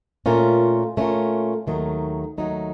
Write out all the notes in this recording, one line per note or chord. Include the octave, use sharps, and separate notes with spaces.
A#2 A3 C#4 F4 A#4
A#2 A3 C#4 F4 A#4
D#2 D#3 F#3 A3 D#4
D#2 D#3 F#3 A3 D#4